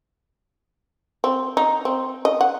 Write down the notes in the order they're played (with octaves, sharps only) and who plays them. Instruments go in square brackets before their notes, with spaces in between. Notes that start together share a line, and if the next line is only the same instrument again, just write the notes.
[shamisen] C4
D#4
C4
D#5
F#5